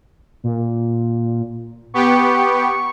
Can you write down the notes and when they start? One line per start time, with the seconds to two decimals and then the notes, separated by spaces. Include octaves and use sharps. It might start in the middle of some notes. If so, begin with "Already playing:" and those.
0.44 A#2
1.94 B3 G4 C#6